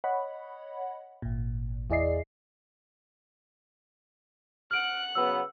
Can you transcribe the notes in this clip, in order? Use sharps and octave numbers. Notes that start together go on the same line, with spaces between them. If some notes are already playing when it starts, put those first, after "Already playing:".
C#5 D#5 F#5 B5
G#1 A#2
E2 E4 G#4 D5 D#5 C7
F#5 F6 F#6 D7
C#3 F#3 B3 E6